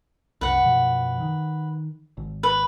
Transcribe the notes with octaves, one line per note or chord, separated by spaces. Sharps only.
C2 F#2 B4 F#5
F#2 B2 F3
D#3
G#1
B4